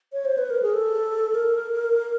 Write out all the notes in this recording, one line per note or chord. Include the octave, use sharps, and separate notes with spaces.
C#5
C5
B4
A#4
G#4
A4
A#4